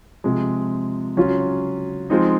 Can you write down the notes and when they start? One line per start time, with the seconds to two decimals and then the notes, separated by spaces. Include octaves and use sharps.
0.24 C3 F3 G#3
1.16 C#3 F#3 C#4 F4
2.10 F3 G#3 C4 D#4